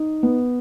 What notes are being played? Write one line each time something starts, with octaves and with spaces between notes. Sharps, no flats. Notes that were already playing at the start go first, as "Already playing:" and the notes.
Already playing: D#4
B3